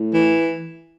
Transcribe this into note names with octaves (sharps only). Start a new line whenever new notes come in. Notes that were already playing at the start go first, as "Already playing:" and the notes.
Already playing: A2
E3